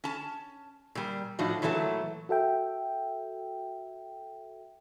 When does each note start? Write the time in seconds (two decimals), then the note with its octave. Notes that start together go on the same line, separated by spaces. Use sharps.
0.04 C#4 A5
0.95 A#2 G3
1.39 A2 F3 D4 D#4 F#4
1.62 A#2 E3 F#3 A3 C5 A5
2.29 F#4 A4 E5 G5